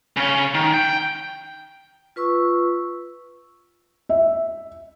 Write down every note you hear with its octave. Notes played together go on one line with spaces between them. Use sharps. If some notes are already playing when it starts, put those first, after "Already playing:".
C#3 C#4
D#3
G5
F4 B4 C#6 E6
E5